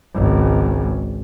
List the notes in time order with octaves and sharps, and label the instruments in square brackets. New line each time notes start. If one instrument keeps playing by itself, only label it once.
[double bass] G#1 C#2